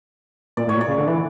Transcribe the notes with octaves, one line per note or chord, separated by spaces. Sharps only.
A#2 D5
A2 C#5
A#2
D5
C#3
D3
E3